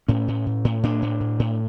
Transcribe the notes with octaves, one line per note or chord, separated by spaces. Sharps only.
A2 C#4
A2
A2
A2
A2 D4
A2
A2
A2